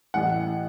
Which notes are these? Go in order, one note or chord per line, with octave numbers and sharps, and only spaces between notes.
A1 A2 E3 F#5